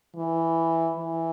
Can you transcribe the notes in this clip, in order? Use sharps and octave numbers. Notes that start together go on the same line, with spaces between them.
E3
E3